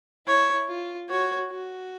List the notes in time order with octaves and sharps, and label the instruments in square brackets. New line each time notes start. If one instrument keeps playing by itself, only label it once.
[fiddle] E4 [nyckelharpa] C#5
[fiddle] F4
[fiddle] F#4 [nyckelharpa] C#5
[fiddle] F#4